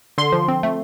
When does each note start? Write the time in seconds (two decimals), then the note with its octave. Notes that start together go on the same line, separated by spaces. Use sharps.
0.18 D3 C6
0.32 F3
0.48 C4
0.63 A3